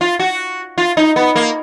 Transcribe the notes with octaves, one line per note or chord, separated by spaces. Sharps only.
F4
F#4
F4
D#4
B3
A#3